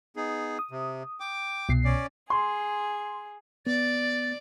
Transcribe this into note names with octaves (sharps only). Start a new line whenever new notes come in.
B3 D#4 G#4
D#6
C3
G5 D6
C2 B2 C7
C#4 D5
G#4 C6
B3 D5 A6